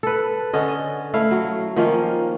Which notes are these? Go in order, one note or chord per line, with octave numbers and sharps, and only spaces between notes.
A4 B4
D3 C#4 D#5
A3 E4 F5
F#3
D#3 F3 A#3 C#4